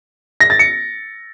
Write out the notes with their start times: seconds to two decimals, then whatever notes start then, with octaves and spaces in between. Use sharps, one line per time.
0.40 A#6
0.50 A6
0.59 C#7